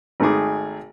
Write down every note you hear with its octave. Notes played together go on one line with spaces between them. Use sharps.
G#1 D#3 A3 D#4 G#4 D6